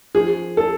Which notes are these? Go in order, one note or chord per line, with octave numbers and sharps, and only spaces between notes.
F3 G#4
A4